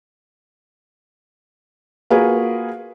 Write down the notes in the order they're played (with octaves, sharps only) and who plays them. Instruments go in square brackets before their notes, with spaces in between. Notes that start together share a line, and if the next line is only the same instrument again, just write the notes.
[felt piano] A#3 F4 F#4 G#4 A#4 B4